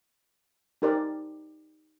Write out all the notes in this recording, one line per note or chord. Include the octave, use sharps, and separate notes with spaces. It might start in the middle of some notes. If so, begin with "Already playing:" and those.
D#4 G4 A#4 C5 D5